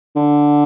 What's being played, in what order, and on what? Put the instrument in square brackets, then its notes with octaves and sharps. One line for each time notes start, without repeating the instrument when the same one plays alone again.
[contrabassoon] D3